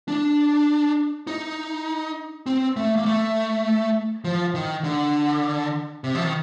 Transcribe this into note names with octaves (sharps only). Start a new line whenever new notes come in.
D4
D#4
C4
A3
A#3
A3
F3
D#3
D3
C3
F3
D#3